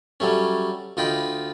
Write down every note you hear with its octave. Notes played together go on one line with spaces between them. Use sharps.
F#3 G3 A3 C#4
D2 F4 D#5 G5 B5